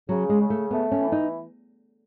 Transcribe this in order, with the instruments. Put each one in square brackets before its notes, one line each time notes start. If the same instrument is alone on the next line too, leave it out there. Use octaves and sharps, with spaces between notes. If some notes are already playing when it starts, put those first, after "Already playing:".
[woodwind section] C#3 [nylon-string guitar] F#3
[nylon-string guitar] G#3
[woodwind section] C#3
[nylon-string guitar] A3
[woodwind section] A3 [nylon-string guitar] B3
[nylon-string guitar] C#4
[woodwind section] E3
[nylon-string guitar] D#4